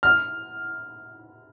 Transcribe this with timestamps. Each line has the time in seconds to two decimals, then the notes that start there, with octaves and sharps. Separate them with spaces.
0.03 F6